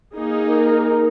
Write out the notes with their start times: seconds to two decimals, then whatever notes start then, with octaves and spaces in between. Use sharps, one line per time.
0.15 A#3 D#4 G#4
0.49 A#4